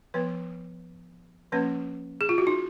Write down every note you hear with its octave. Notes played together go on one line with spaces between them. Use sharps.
F3 B3 B4
F3 A#3 C#4 B4
G#4
F4
F#4
D#4